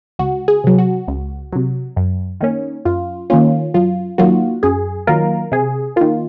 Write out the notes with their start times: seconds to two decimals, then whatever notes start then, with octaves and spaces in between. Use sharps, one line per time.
0.19 C#2 F#4
0.48 G#4
0.64 C3 F#3
0.78 F#4
1.08 C#2
1.53 C3 F#3
1.96 F#2
2.41 D#3 A#3 C#4
2.85 F#2 F4
3.30 D#3 A#3 C#4 F4
3.74 F#2 F4
4.18 D#3 F#3 A#3 F4 F#4
4.63 F#2 G#4
5.07 D#3 F#3 A#3 F4 A#4
5.52 C3 G#4
5.96 D#3 A#3 F4